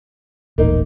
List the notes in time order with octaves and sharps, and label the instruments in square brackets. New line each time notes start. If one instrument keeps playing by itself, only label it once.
[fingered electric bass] D#1 A1 [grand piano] A#3 D#4